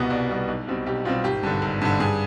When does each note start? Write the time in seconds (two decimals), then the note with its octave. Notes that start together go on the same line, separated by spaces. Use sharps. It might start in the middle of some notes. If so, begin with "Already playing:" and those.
Already playing: C2 B2 G3 B3 D#5
0.10 C2 D5
0.29 B2 G3 B3
0.48 B1
0.68 B2 G3 C4
0.86 B1 G4
1.05 B2 G3 C4 F4
1.24 G#1 G4
1.43 G2 D3
1.62 G#1
1.81 G2 D3
2.00 G2 G#4